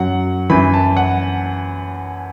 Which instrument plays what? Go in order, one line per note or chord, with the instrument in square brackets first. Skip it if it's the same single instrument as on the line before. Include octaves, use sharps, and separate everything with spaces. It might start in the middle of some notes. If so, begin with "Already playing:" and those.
Already playing: [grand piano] F#2 F#3 F#5
F#2 E3 B5
A5
F#5